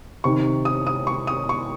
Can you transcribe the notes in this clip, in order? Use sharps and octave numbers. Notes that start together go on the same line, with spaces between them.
C3 D#3 C#6
D#6
D#6
C#6
D#6
C#6